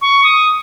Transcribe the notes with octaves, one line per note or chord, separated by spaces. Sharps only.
C#6
D#6